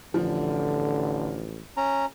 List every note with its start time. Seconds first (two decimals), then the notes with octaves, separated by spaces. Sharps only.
0.14 A1 D3 F3
1.77 C#4 A#5